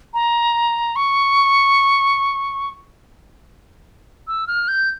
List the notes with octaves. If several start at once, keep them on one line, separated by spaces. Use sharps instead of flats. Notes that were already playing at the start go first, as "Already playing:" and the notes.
A#5
C#6
E6
F6
G6